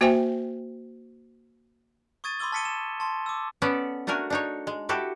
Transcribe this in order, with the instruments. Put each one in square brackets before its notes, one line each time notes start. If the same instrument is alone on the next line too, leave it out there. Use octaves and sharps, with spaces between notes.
[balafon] A#3 F#4 C5 E5 G5 G#5
[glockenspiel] C#6 D#6 G#6 A6 D#7
B5 C6 D6 E6 G7
A5 F6 B6 C#7 D#7 G7
E7
A5 C6
D6 E6
[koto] B3 C#4 A4 D5
A3 D4 F#4 A#4 G#5
D4 D#4 C#5
G#3
E4 F#4 G4 A4